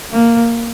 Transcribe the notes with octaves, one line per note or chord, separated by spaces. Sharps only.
A#3